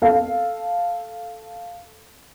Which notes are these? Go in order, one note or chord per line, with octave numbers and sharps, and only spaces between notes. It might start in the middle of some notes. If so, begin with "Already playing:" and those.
A4 F5